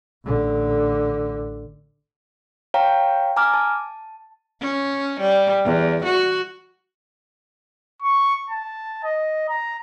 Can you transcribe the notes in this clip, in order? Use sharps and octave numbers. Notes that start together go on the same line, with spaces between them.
A1 D3
C#5 F5 G5 A#5
G#5 A#5 D6 F6
A5
C#4
G3
E2
F#4
C#6
A5
D#5
A#5